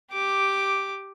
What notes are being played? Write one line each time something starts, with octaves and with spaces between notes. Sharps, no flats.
G4 D6